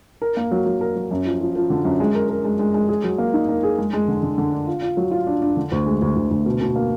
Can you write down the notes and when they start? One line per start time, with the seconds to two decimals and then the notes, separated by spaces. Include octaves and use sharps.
0.22 A#4
0.37 A#3
0.51 F#3
0.66 F#3
0.81 A#4
0.96 F#3
1.11 F#2
1.25 F3
1.40 F3
1.56 F3
1.70 D3
1.85 F#2
2.00 G#3
2.15 A#4
2.29 A#4
2.44 G#3
2.59 G#3
2.74 G#3
2.89 G#4
3.04 F#3
3.18 A#3
3.34 D#4
3.49 A#3
3.63 G#4
3.78 G#3
3.93 G#3
4.08 D3
4.23 D3
4.38 D3
4.52 D4
4.67 F4
4.82 F4
4.97 F#3
5.11 F4
5.27 D4
5.42 D4
5.57 D3
5.72 D2
5.86 G#3
6.02 D2
6.16 D2
6.31 D2
6.46 B2
6.61 B2
6.76 A#3